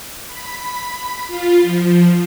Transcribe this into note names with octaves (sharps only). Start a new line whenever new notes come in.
B5
F4
F3